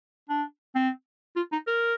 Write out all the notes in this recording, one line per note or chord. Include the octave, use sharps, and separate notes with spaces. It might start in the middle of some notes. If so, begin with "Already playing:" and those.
D4
C4
F4
D#4
A#4